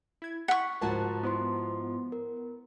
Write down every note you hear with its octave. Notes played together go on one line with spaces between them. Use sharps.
E4 G#6
F#5 C#6 B6
C#2 G#2 F3 F#4 A#4 A5 F#6
B3 E4 C5 C6
A#4